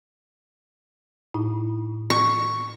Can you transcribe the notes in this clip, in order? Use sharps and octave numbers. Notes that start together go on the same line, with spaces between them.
A2 D#4 E4
C#6